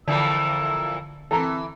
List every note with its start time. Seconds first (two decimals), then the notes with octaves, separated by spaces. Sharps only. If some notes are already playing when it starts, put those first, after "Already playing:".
0.08 F2 A#2 D3 E3 E6
1.31 E3 C4 A4 A#5